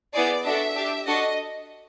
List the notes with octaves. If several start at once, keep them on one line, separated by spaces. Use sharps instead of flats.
B3 E4 G#4 D5
D4 F#4 A4 E5
D4 G4
D4 F#4 A4 D#5